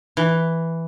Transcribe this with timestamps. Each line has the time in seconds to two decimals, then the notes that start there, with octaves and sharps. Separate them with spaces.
0.17 E3